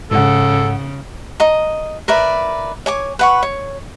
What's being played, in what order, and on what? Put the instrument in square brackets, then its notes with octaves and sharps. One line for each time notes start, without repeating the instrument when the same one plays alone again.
[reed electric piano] G#2 F#5 [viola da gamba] C#3 [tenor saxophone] A4
[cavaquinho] D#5 A#5
A#4 B4 D5 E5
C#5 G#5 D6
B4 F#5 C#6
C#5